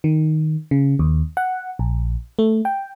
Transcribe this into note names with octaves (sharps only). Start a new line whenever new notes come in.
D#3
C#3
D#2
F#5
A#1
A3
G5